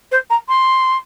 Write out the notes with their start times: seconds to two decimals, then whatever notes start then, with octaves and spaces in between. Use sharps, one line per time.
0.11 C5
0.30 A#5
0.48 C6